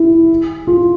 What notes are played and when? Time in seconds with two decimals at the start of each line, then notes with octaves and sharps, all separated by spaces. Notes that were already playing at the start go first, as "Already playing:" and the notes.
Already playing: E4
0.67 F4